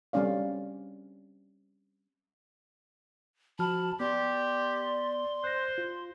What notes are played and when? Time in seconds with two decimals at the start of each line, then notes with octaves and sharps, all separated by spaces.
0.13 G3 C4 C#4 D5 F5
3.59 F3 F#4 A5 B5 F6
4.00 B3 G4 D5 C6
5.44 C5 F#6 A#6
5.78 F4